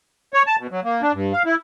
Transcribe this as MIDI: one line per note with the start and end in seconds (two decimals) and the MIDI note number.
0.34 0.43 73
0.47 0.56 81
0.59 0.67 47
0.71 0.80 54
0.84 1.02 58
1.02 1.12 62
1.13 1.33 43
1.33 1.43 77
1.46 1.55 64